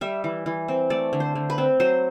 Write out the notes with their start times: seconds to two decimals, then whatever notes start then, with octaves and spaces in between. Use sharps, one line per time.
0.01 G3 E5
0.24 E3
0.46 E3
0.68 C4
0.90 A3 D5
1.13 D3
1.20 C5
1.35 D3
1.50 B4
1.58 C4
1.80 F#3 C5